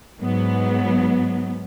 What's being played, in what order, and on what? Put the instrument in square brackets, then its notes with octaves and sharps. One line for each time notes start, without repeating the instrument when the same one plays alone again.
[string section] G#2 F#3 B3